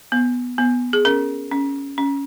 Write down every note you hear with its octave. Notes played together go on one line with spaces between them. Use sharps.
B3
B3
G#4
C#4 A#4
C#4
C#4